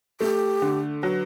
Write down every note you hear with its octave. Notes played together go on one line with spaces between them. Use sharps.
A3 G4
D3
F#3 B4